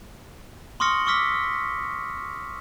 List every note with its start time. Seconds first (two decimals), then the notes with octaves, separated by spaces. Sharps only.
0.80 C6 C#6 D#6 F6 A#6 C#7
1.07 C#6 D6 E6 F6 B6